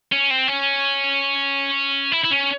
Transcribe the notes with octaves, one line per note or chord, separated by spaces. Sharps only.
C#4
C4
C#4
E4
E4
C#4